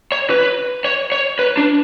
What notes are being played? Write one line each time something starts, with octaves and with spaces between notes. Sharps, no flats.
C#5
B4
C#5
C#5
B4
D4